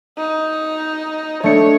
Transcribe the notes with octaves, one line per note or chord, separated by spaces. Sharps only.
D#4
A3 D4 C#5 C#7